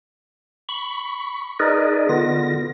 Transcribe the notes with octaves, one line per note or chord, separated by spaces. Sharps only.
B5 C#6
D#4 G#4 A#4 B4 D5 D#5
D3 B3 F4 A#6